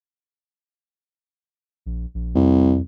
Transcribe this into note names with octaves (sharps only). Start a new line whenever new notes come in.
A#1
A#1
C2 F2